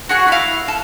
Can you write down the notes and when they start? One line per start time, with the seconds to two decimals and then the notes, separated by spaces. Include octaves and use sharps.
0.09 F#4 G#4 F#5
0.28 E4 F5
0.68 A4